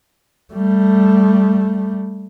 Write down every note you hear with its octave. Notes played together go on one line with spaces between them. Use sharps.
G3 A3